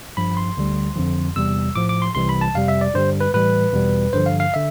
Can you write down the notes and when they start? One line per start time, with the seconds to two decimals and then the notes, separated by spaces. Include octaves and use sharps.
0.17 G2 F3 B5
0.37 C6
0.57 D2 D3 G3
0.96 F2 D3 F3
1.36 E2 C3 G3 E6
1.75 A2 F3 D6
1.89 D6
2.02 C6
2.15 C2 C3 E3 G3 C6
2.29 B5
2.41 A5
2.55 F2 C3 G3 F5
2.68 E5
2.81 D5
2.94 G2 D3 G3 C5
3.21 B4
3.34 A2 E3 G3 B4
3.73 E2 B2 G3
4.13 G2 D3 F3 C5
4.26 F5
4.40 F5
4.54 D3 E5